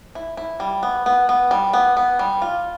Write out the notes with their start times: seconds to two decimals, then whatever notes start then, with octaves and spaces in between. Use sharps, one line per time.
0.15 E4
0.37 E4
0.60 G3
0.83 B3
1.06 B3
1.29 B3
1.51 G3
1.73 B3
1.97 B3
2.19 G3
2.42 F4